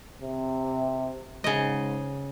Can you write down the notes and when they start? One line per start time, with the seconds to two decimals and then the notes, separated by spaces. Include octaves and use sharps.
0.21 C3
1.44 G#2 C#3 D#5